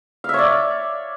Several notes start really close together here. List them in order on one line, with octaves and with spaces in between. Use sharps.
F5 E5 C#5 D5